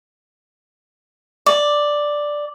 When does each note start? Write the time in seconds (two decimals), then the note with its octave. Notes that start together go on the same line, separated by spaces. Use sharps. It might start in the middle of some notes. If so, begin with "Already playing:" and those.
1.46 D5